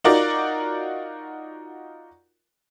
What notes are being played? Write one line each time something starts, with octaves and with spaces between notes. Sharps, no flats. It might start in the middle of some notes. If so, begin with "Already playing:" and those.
D#4 F4 F#4 A#4 D5